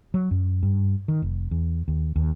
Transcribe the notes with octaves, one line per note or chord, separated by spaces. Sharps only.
F#3
F#2
G2
D#3
F1
E2
D#2
D#2